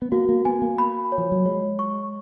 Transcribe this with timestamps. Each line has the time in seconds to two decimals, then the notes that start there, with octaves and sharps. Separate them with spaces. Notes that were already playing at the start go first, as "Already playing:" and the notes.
0.02 B3
0.12 A#3 F#4
0.29 A#3
0.45 B3 G#5
0.62 A#3
0.78 B5
1.12 C#5
1.18 F3
1.32 F#3
1.46 G#3 C#5
1.79 C#6